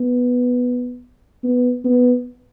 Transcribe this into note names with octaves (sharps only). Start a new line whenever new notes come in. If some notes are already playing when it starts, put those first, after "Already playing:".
Already playing: B3
B3
B3